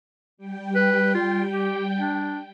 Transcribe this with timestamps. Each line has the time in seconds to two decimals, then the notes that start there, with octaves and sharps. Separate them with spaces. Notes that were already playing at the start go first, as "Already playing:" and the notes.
0.37 G3 G5
0.75 B4
1.14 F4
1.52 G4
1.99 D4